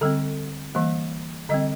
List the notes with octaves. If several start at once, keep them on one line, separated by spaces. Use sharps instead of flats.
D3 G3 C4 A4
E3 G3 A#3
D3 G3 C4 D#5